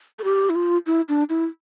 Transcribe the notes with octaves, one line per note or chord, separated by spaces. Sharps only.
A4
G4
E4
F4
E4
D4
E4